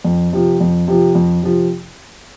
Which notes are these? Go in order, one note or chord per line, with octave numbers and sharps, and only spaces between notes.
F2
C3 F3
F2
C3 F3
F2
C3 F3